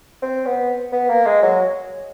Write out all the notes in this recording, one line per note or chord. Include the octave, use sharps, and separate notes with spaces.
C4
B3
B3
A#3
G#3
F#3